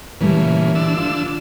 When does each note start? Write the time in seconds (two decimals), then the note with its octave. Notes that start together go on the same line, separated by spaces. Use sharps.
0.21 A#2 C#3 E3 G3 A3
0.75 D3 D4 E6
0.97 F4